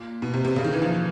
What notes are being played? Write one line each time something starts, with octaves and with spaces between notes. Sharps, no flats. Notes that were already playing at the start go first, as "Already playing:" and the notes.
Already playing: A#2
B2
C3
C3
C#3
D#3
E3
F3